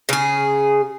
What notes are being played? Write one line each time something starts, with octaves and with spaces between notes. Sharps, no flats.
C#3 G#4